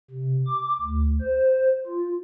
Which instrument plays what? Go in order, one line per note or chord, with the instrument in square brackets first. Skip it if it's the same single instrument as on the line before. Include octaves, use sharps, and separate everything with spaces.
[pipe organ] C3
D6
D2
C5
F4